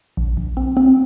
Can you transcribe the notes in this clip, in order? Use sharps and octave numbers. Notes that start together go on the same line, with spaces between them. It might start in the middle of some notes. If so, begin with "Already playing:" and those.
A#1
A#1
C4
C4